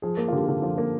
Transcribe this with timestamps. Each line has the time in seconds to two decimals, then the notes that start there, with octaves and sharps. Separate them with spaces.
0.02 F3 G#4
0.17 A#3
0.28 F4
0.33 D3 G4
0.48 D3
0.62 F3 F4
0.78 A#3